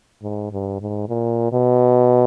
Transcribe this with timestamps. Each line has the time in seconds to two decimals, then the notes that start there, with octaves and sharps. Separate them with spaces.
0.22 G#2
0.52 G2
0.81 G#2
1.09 A#2
1.52 B2